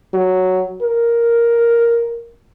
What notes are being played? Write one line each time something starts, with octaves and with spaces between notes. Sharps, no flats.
F#3
A#4